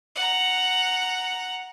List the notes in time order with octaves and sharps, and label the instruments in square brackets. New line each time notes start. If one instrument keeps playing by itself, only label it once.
[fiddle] F#5 A#5